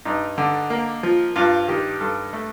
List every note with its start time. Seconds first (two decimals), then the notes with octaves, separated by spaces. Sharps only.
0.05 G2 D#4
0.38 D3
0.70 A#3
1.03 F3
1.36 G2 F4
1.68 D#3 G4
2.00 G2 A4
2.33 A3